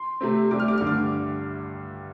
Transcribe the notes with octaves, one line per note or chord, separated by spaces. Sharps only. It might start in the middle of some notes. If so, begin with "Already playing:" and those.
Already playing: C6
C3 A3 C4
C2 C3 A3 D4 D6
F6
D6
G2 D3 A3 F6
D6